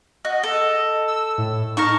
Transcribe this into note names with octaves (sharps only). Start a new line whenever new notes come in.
F#4 D#5
A4
E6
A2
D#4 A#4 A5 C#6